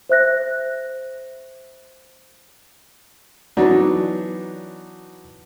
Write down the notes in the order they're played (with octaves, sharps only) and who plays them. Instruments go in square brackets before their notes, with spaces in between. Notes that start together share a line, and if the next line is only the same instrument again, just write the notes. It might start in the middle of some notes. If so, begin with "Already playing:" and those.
[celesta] C5 E5 F#6 A#6
[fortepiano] E3 F#3 B3 D4 D#4